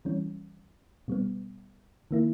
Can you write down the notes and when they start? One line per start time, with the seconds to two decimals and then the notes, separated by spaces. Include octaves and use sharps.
0.05 E3 G3 C#4
1.08 B2 G3 B3
2.11 D#3 A#3 E4